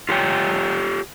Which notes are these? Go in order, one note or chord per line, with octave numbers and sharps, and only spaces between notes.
F4 G4 C#5 G5